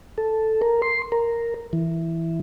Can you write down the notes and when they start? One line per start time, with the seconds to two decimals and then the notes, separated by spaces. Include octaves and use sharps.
0.18 A4
0.62 A#4
0.82 C6
1.12 A#4
1.73 E3